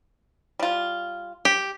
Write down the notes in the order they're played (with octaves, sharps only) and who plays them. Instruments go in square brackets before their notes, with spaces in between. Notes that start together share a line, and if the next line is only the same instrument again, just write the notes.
[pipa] G3 F4
[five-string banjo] G4